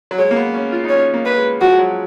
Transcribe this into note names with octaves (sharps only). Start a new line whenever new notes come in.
F#3
G#3 C#5
A#3
B3
C#4
F4
D#4
C#4 C#5
A#3
B4
G#3
F3 F#4
G#3
F#3